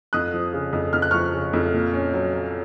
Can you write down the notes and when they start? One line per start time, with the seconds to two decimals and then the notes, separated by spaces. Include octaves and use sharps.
0.13 F2 D#6 F#6
0.34 F3
0.53 C#3
0.73 F2
0.93 F2 F6
1.02 F#6
1.11 F3 C#6 F6
1.34 C#3
1.53 F2
1.73 A#2
1.93 C#4
2.14 F#3